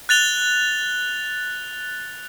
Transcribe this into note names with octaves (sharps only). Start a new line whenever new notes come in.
F#6 A6 F7 G7